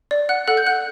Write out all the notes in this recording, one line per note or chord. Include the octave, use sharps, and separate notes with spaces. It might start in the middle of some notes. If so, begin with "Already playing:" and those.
D5
F#5 F#6
A4 F#5 F#6
G6
F#5 F#6